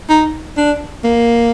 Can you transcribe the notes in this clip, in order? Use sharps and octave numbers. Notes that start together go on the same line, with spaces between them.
D#4
D4
A#3